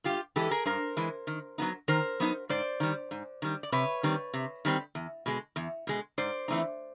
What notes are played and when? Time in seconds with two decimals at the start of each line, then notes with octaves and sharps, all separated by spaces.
0.04 G2 F4 G4
0.36 E3 G#3 G4 A4
0.51 G#4 A#4
0.66 G2 A#4 C5
0.97 E3 G#3
1.27 D#3
1.58 F#3 B3 D#4
1.88 D#3 A#4 C5
2.20 F#3 B3 D#4
2.49 G#2 C5 D5
2.80 D#3 G3
3.11 G#2
3.42 D#3 G3
3.63 D5
3.72 C3 B4 C#5
4.03 D#3 G3 C4
4.34 C3
4.65 D#3 G3 C4
4.95 E2
5.26 B2 G#3
5.56 E2
5.87 B2 G#3
6.18 G#2 C5 D5
6.48 E3 A3 C4 D#4